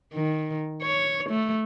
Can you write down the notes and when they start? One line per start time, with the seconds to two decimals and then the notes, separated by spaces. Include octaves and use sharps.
0.13 D#3
0.83 C#5
1.30 A3